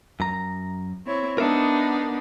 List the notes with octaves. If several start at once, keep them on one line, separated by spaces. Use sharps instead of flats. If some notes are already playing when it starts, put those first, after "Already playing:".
F#2 A#5
C4 E4 C#5
B3 D4 D#4 A#4 E5